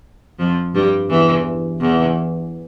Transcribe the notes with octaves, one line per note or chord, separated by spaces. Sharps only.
F2 F3
G2 G3
E2 E3
E2 E3